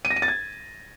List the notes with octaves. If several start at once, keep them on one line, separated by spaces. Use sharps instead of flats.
D#7
A#6
D#7
A6
G#6